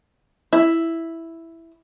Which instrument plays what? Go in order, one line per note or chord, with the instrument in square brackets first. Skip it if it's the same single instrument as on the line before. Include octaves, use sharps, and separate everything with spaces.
[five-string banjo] E4